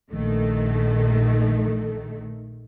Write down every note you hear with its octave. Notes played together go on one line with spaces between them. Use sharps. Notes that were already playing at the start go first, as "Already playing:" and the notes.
A#1 D#3 A3